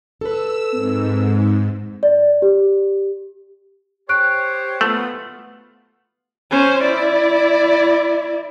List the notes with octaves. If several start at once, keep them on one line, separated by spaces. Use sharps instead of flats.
A4 B4 E6
G#2 C4
D5
G4
G4 C5 C#5 C#6 F#6 D7
A3 B3 F4 F#7
C#4 C5
E4 D5